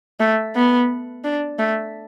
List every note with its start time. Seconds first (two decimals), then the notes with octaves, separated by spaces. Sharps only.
0.20 A3
0.55 B3
1.24 D4
1.59 A3